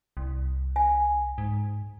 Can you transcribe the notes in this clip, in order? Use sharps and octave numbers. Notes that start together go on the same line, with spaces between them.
C2
G#5
G#2